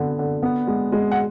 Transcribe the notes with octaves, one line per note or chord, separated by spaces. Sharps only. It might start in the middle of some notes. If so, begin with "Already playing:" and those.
Already playing: D3 B3
D3
B3
G#3
G#3
F#5